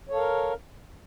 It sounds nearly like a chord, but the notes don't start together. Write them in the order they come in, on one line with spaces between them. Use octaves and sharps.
C#5 A4 F5 A#4